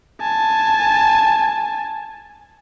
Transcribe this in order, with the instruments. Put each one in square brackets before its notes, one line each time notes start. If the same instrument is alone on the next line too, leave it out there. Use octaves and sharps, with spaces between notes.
[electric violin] G#5 A5